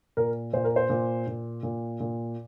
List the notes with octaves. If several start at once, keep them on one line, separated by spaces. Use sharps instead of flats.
A#2 A#4
A#2 C5
A#4
C5
A#2
A#2
A#2
A#2